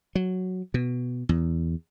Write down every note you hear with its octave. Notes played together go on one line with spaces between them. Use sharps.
F#3
B2
E2